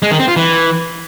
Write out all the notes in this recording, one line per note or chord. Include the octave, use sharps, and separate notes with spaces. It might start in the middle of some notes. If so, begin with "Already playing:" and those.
G#3
D#3
C4
F4
E3